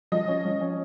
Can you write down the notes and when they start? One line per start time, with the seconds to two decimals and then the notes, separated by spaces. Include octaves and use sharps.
0.12 F3 D#5
0.28 C#4
0.45 F3
0.61 C#4